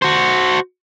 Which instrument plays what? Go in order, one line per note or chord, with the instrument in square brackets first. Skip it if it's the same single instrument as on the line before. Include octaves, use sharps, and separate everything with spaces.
[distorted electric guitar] F#4 C5